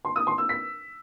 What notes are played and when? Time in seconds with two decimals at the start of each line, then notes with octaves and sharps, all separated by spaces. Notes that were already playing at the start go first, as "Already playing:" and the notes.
0.05 C6
0.16 D#6
0.27 C6
0.38 E6
0.49 B6